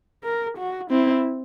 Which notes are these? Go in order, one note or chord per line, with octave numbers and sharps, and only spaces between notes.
A#4
F#4
C4 E4